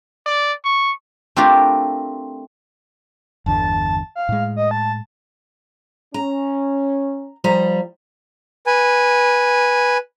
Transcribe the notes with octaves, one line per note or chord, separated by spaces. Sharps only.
D5
C#6
A3 C4 D4 F4 G4 A#4
G1 E2 D3 A5
F5
A2 G#3
D#5
A5
C#4 A#5
F3 G3 A#5
B4 G#5